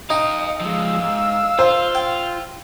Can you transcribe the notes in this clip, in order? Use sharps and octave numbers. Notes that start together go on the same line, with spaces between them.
D#4 D#5 F5 G5
F3 G#3 F5 E6
G#2
F4 C5
G5